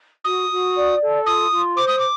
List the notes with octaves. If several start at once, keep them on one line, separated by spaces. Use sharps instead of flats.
F#4 D#6
F#4
D5
A4
F4 D#6
F4
C5 D6
D#6
D6